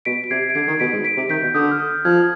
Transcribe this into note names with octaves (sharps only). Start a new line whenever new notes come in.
B2 B6 D7
D7
C3 G#6 C7
D7
D3 G#6 C7
D#3
B2 B6 D7
G#2
B6 D7
C3
D#3 G6 B6
B2
D3 D#6 G6
F6
D#6 G6
F3 F6 G#6